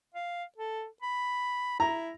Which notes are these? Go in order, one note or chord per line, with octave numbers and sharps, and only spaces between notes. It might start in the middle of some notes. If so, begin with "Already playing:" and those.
F5
A4
B5
E4 A#5